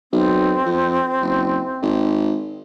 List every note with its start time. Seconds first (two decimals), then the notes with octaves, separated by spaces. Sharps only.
0.12 B1 C4
0.66 F2
1.21 F#1
1.82 G#1